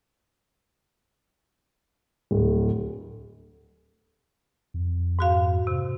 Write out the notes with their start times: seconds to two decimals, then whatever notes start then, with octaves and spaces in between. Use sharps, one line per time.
2.31 D1
4.74 F2
5.19 G#2 F#4 F5
5.67 C3